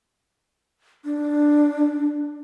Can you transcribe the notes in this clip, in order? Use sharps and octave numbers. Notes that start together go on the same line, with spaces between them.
D4